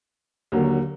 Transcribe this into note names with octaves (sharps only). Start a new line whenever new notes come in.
D#2 D3 F#3 A#3